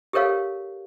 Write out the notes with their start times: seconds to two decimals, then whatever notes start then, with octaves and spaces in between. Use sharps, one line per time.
0.13 G4 A4 A#4 C#5 F5